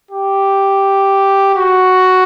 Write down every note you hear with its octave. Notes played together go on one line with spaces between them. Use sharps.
G4
F#4